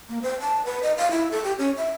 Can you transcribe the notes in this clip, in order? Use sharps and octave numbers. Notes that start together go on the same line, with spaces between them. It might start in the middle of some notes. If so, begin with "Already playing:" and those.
A#3
C5
A5
B4
D#5
F5
E4
A4
G4
C#4
E5